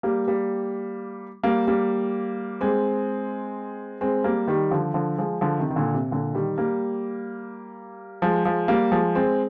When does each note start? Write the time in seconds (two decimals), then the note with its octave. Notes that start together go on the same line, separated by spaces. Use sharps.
0.03 G3 A#3
0.28 G3 A#3
1.43 G3 A#3
1.67 G3 A#3
2.61 G#3 C4
4.01 G#3 C4
4.24 G3 A#3
4.48 D#3 G3
4.71 D3 F3
4.94 D3 F3
5.18 F3 G#3
5.41 D3 F3
5.59 C3 D#3
5.70 D#3
5.76 A#2 D3
5.94 C3
6.11 A#2 D3
6.34 D#3 G3
6.58 G3 A#3
8.22 F3 G#3
8.45 F3 G#3
8.68 G3 A#3
8.91 F3 G#3
9.15 G#3 C4